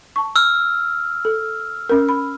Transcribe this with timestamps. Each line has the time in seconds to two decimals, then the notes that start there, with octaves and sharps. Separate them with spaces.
0.16 A5 C#6
0.36 E6 F6
1.25 A4
1.89 C#4 A#4
2.09 B5